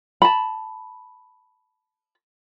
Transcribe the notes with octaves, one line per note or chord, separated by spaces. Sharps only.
A5 B5